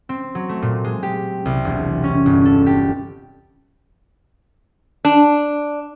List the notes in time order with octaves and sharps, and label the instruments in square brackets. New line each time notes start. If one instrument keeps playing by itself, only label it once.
[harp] C4
F#3
A3
A#2
G#3
G4
C2
E1
C#4
G1
A4
G4
[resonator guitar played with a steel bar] D4